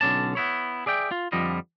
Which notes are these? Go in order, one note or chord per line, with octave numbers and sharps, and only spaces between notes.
B1 D3 C#4 D5 A5
B3 E4 C#5
G#4 D5 E5 G5
F4
F2 D3 F3 G3 D#5